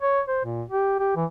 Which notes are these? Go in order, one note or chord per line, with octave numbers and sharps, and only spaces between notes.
C#5
C5
A#2
G4
G4
E3